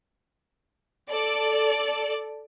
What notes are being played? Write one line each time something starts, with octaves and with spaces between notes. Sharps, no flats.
A4 D5